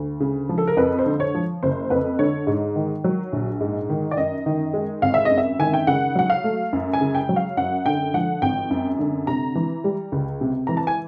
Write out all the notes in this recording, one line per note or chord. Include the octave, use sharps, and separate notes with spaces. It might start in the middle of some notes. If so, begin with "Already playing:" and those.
Already playing: D2
C#3
F3
A4
A#4
F2 B4
C5
D3
C#5
F3
F#1 C5
F2 B4
D3 C#5
G#2
D#3
F#3
A#1
G#2
D#3
D5
F#2 D#5
D#3
G#3
G#1 F5
E5
D#5
F#2
E5
D#3 G#5
G5
C#3 F#5
F#3 F#5
F5
A3
F#2
G#5
C#3
G5
F#3
F5
F#2 F#5
D3 G5
F3 F#5
G#1 G5
F#2
D3
C3 A#5
E3
G3
C#2
C3
E3 A#5
A5
G#5